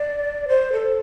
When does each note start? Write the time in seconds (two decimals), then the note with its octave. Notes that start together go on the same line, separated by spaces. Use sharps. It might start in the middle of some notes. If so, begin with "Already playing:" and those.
Already playing: D5
0.48 C5
0.73 A4